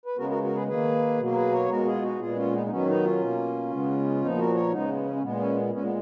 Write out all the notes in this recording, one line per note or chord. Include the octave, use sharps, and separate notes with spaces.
B4
C#3 G#3 B3 F#4 A#4
F#4 A#4
F#4 A#4
G#4 B4
D#3 A#3 G#4 B4
B2 F#3 A#3
A#4
G#4 B4
A#4 C#5
B2 G#3 B3 F#4 A#4
F4 G#4
D#4 F#4
A#2 G#3 B3 F4 G#4
C#4 F4
B3 D#4
D#4
D#3 F#3 B3 C#4
B3 D#4
C#4 F4
B2 A#3
C#3 G#3 B3
A#2 F3 B3 D#4
F#4 A#4
A#4 C#5
C#3 G#3 B3 D#4
B3
C#4
C#4
A#2 G#3 B3
C#4
A#2 G#3 B3 C#4
B3